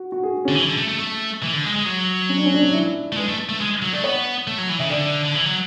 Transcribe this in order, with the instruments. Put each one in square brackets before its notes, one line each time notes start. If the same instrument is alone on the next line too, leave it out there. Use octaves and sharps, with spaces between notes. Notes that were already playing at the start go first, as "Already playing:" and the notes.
Already playing: [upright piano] F#4
F#4
G#4
[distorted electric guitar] D3 [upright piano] C#4
[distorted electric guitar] E3
D3
A3
A3
A3
E3
D3
G#3
G#3
F#3
[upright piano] C#4
D4
C#4
D4
C#4
E4
[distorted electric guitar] A3
[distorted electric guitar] G#3 [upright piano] B4
[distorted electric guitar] A3
A3
G#3
F#3
[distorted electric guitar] A3 [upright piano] D5
[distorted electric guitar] B3 [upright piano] C#5
[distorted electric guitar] A3
F#3
E3
[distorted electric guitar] C#3 [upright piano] E5
[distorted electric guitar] D3 [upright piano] D5
[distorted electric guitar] D3
E3
F#3